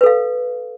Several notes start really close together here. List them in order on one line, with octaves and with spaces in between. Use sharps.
B4 A4 F5